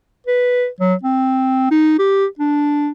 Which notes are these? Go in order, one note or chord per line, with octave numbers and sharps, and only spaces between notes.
B4
F#3
C4
D#4
G4
D4